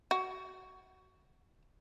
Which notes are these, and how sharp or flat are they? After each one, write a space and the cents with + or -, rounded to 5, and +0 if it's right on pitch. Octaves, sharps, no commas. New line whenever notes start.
F#4 +20